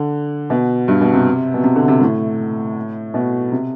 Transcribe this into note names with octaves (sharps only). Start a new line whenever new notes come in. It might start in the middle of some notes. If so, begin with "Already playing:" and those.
Already playing: D3
B2
G2
B2
C3
B2
C3
D3
C3
A2
B2
C3